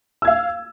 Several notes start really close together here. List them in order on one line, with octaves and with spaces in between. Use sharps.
E6 G#6 F5